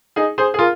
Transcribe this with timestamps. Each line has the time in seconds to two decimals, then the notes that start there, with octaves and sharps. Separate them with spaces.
0.16 D#4 G#4
0.38 G#4 C5
0.54 G#4
0.59 F4 A#4